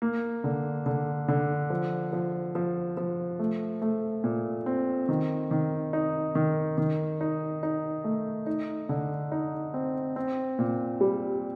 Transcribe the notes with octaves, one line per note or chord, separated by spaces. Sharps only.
A#3
D3
D3
D3
F3
F3
F3
F3
A3
A3
A#2
C4
D#3
D#3
D#4
D#3
D#3
D#4
D#4
A3
D#4
D3
D#4
C4
C4
A#2
G3